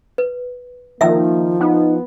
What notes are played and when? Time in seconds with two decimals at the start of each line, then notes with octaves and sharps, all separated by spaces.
0.18 B4
1.01 D#3 F3 A#3 E5 E6
1.60 B3 D#4